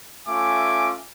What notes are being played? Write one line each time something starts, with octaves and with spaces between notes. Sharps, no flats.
A3 C#4 F4 E5 G#5 D6